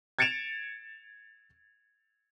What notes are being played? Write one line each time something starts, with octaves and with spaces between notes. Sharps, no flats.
G#6 A6 C#7 D7 E7 F7